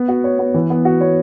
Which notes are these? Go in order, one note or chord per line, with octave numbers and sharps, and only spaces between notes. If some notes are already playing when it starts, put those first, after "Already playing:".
Already playing: B3
F#4
C#5
B3
E3
B3
F#4
C#5